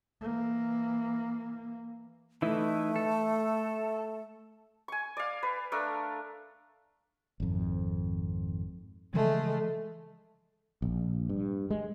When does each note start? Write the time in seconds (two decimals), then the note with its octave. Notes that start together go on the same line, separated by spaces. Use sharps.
0.21 E3 A#3
2.42 E3 A3 D#4 E4
2.96 A4
4.88 G#5 C#6
5.17 D5 F5
5.43 B4
5.72 A3 D4 A4 A#4
7.40 G#1 F2
9.14 C#3 E3 F3 G#3 A3
10.82 A#1
11.29 G2
11.70 G#3